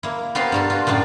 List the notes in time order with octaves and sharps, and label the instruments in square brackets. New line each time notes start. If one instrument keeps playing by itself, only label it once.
[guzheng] A#3 E4
B3 F4 G4 A#4 C5 F5
G2 A#3 A4
F4 F#4
F#2 A2 A#3 D4